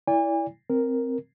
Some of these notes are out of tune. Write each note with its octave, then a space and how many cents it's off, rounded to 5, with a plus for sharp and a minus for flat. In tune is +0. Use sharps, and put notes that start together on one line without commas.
E4 -5 D5 -30 G#5 -40
C4 +0 A#4 +0